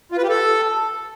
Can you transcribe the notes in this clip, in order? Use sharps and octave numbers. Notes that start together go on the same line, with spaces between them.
F4
B4
G4
A4